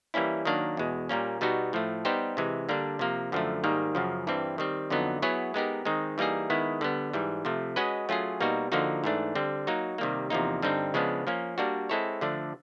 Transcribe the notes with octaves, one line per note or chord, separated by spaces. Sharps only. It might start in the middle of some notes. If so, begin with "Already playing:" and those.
E3 G3 A#3 C#4 E4
D#3 F#3 A#3 D4
E2 B2 G#3
A#2 G3 A#3 C#4
B2 G3 B3 D#4 F#4
A2 F3 A3
G3 B3 D#4 G4 C5
C3 E3 G#3
D3 G3 A#3 D4
C3 F3 A#3
F#2 D3 F3 A3
G#2 D#3 G3 A#3
F#2 C#3 F3
G2 E3 G3 C4
D#3 G3 C4
F2 D3 F#3 B3 D#4
F#3 B3 E4 G#4 C#5
G#3 B3 D#4 G4 A#4
D#3 G#3 C4 D#4
E3 G3 A#3 D#4 G#4
D#3 G#3 B3 E4
D3 G3 B3
G#2 E3 G3
C3 F3 A3
G#3 C#4 F#4 B4 D#5
F#3 A3 C#4 F4 G#4
B2 G3 A#3 D#4 F#4
D3 F3 A#3 D#4 F#4
G#2 E3 A3 D4
D3 G3 C4
F#3 A#3 D#4 F#4
C3 D#3 G3 A#3
E2 C3 F3 A#3 D#4
G2 D3 G3 C4 D#4
C#3 F3 G#3 B3 D4
F3 A#3 C#4
G3 A#3 D4 F#4
G#3 C4 E4 A4 C#5
D3 F3 A3 D4